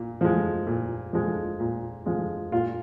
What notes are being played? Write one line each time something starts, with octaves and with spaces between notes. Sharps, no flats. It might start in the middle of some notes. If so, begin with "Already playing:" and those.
Already playing: A#2
F3 G#3
A#2
F3 G#3
A#2
F3 G#3
A#2 F4